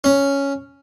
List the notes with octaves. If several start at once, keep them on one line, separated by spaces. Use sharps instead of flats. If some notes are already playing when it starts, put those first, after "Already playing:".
C#4